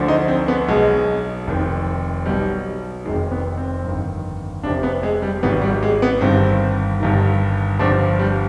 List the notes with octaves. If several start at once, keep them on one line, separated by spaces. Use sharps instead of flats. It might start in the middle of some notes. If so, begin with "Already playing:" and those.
Already playing: D2 D3 F3
D#4
C4
B3
B1 B2 G#3
F1 F2 D#3
B1 B2 G3
F1 F2 D#3 G#3
B3
C4
G1 F2 D#3
F1 F2 C3 F3 D4
B3
G#3
G3
G#1 G#2 D#3 B3
G3
G#3
B3
G1 G2 D#3 C4
G1 G2 D#3
G1 G2 F3 D4
G3